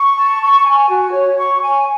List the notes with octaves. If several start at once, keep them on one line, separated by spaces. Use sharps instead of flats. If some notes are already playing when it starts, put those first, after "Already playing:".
Already playing: C#6
A5
C#6
G#5
F#4
C#5
C#6
G#5